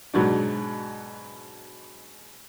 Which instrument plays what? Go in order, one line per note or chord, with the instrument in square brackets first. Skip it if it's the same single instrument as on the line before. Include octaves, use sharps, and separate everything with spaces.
[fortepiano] G#2 B2 F#3 D4